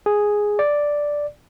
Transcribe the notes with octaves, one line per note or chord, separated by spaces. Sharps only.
G#4
D5